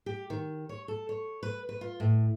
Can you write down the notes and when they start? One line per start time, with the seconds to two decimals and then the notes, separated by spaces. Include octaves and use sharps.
0.06 G4
0.30 D#3
0.69 C#5
0.88 A4
1.09 C#5
1.43 B4
1.69 B4
1.81 F4
2.00 A2